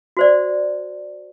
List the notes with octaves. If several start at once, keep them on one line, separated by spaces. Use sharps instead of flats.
F#4 C5 D5